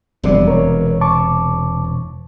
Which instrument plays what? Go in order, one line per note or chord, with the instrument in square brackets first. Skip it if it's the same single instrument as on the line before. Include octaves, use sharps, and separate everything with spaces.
[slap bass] E1 C3 [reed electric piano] F2 G3 D5
[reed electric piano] A#4 C#5
A5 C#6 D6